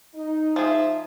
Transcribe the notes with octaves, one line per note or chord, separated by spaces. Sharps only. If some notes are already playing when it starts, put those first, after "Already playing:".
D#4 D#5
F3 G#4 E5